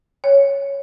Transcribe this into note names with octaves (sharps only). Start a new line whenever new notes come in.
C#5